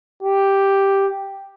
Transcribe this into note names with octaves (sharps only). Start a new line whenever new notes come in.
G4